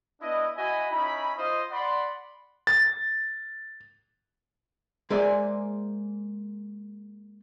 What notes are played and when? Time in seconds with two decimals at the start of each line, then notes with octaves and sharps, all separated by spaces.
0.21 B3 D4 E4 D#5
0.57 E4 F#4 D#5 G#5 B5
0.91 C#4 D#4 E4 B5
1.37 F4 C5 D#5
1.71 D5 F#5 B5 C6
2.67 A6
5.10 G#3 A#3 G#4 C5 D5 E5